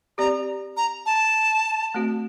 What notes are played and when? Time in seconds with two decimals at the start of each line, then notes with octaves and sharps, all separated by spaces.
0.18 C4 G4 D5 A#5
0.77 A#5
1.06 A5
1.94 A3 C4 F#4